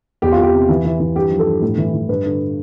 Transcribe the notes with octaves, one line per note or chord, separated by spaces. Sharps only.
E2 G4
F4
E2 G4
C3
E3
E3
E3
G2 G4
F3
A4
G2
A2
E3
E3
G2 B4
D3